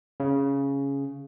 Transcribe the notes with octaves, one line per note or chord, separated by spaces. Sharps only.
C#3